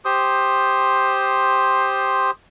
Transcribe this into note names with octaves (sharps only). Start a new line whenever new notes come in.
G4 C5 C6 D#6